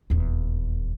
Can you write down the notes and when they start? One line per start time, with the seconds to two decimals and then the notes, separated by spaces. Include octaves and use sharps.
0.10 D#1 E2